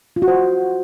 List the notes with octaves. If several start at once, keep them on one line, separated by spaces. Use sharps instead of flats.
F4
F#4
C5